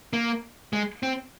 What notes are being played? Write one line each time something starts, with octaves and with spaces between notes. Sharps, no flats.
A#3
G#3
C4